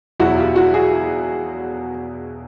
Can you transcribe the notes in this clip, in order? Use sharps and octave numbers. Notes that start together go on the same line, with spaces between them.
E2 B2 F#3 E4 F#4
F4 G4
E4 F#4
F#4 G#4